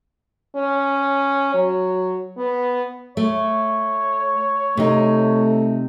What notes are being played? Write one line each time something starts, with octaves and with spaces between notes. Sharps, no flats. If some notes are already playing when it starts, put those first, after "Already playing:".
C#4
F#3
B3
A3 C#5
C3 A3 D#4